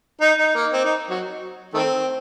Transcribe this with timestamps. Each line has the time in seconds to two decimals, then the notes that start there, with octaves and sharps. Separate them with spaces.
0.21 D#4
0.39 D#4
0.55 A#3
0.72 C4
0.85 D#4
1.10 F#3
1.74 D#3 A3 C4